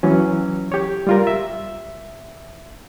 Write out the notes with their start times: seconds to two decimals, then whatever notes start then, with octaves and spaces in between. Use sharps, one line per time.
0.03 E3 F#3 C#4
0.72 G4 C#5
1.07 G3 F4 A#4
1.27 E5